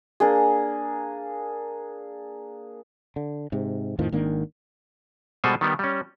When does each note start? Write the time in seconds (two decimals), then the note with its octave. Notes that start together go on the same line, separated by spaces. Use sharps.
0.20 A#3 D4 G#4
3.16 D3
3.52 G#2 C3
3.99 F2 A2 D#3 F3
4.12 G#1 D#3 A#3 D4
5.44 B2 G3 G#3 A4 C5 G#5
5.61 D#3 G3 B3
5.79 G3 C#4